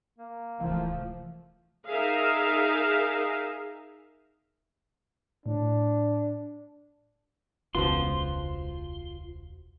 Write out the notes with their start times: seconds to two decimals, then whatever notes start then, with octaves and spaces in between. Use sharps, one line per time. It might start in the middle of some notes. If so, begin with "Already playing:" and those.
0.18 A#3
0.60 D1 C2 E3 F3 A3 F5
1.89 D#4 G#4 A#4 E5 F5
5.46 A2 D4
7.75 E1 C#2 F4 F#4 B4 C5 C6